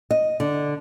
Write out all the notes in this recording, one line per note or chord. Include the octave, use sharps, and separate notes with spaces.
D#5
D3